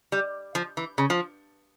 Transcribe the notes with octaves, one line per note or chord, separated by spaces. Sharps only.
G3
F3
E3
C#3
F3